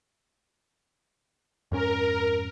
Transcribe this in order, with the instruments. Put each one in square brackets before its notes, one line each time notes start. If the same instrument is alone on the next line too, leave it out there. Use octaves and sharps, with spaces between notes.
[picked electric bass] F2 G#2 C#4 [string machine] A#4